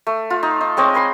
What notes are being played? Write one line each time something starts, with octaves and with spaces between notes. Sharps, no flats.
A3
F4
D#4
D#4
G#3 C4 C#5 D#5
G#5 B5 C6 D6